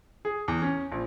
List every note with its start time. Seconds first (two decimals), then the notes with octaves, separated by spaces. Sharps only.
0.25 G#4
0.48 E2
0.62 C#4
0.92 A#1